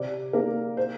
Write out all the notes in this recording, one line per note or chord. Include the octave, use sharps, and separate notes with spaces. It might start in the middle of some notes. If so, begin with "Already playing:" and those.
Already playing: C3 D5
A#3 A#4
C5